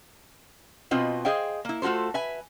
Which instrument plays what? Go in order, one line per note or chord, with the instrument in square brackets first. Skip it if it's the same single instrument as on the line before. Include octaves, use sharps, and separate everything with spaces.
[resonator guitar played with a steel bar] B2 C4 F4 B4 D#5
G#4 C5 D#5 F5 G5
A#3 E4
A3 F4 F#4 A4 C5
B4 E5 G#5